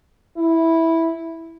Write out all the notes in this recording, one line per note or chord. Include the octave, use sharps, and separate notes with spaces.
E4